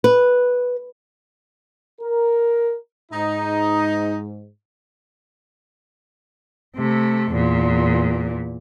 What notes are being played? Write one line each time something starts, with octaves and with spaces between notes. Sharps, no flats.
B4
A#4
G#2 D#4
C3 A3
E2 A#2